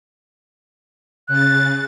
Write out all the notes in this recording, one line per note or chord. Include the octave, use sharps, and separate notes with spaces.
C#3 F#6 A6